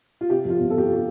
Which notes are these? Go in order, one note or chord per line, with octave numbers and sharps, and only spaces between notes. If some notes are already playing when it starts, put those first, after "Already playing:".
F4
C3 G4
F2 F4
G1
A4
G1 G4
F4
C3 G4